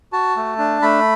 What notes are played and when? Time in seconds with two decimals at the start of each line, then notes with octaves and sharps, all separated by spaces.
0.13 F#4 A5
0.37 A3
0.58 D4
0.82 A3 B5